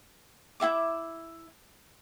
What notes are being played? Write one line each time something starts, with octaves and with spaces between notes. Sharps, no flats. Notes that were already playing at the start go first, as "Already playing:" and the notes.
E4 F#4 E5 D6